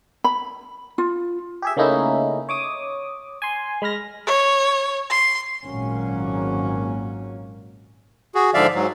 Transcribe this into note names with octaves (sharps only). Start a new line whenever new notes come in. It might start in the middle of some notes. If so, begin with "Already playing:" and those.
B5
F4
G4 G#4 E5
C#3 A3 A#3 C#4 D#4 E4
C#5 D6 D#6
G#5 C6
G#3 B5 F6 A#6
C#5
C6
G#1 A#2 F#3 A#3 C#4
F#4 G#4
G#2 D3 F3 D5 E5 F5
G#2 F#3